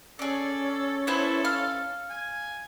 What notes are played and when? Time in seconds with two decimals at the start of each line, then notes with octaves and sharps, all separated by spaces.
0.19 C#4 G#4 A4 D5
1.07 B3 E4 A4 C5
1.45 F5
2.10 G#5